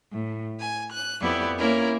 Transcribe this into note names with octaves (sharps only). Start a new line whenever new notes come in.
A2
G#5
F#6
F2 B3 E4 G4 D5
A#3 C#4 E4 A#4